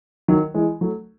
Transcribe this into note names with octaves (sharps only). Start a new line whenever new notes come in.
D#3 F#3
E3 G#3
F#3 A3